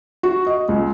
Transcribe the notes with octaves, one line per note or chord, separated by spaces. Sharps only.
F#4
D#5
C#2